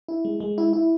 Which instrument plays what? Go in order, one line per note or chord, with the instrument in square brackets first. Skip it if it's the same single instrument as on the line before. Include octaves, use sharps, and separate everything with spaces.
[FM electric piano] E4
G#3
G#3
E4
E4